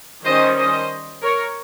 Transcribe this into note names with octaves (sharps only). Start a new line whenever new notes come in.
D#3 G3 C#4 C5 D#5
C5 D#5
A#4 C#5